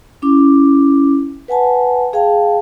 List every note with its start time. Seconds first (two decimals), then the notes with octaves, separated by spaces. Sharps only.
0.22 C#4 E4 D6
1.48 B4 F#5 G#5 A5
2.13 G#4 F5 G5 A5